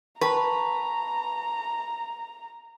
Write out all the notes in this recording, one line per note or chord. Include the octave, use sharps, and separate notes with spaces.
B4 G5 A5 A#5 C#6